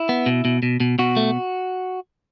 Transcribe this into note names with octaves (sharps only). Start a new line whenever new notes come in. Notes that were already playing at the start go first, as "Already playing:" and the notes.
Already playing: E4
B3
B2
B2
B2
B2
B2 F#4
A3